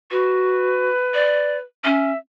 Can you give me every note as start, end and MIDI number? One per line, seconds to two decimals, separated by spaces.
0.11 0.90 66
0.11 1.60 71
1.14 1.57 74
1.85 2.12 61
1.85 2.17 76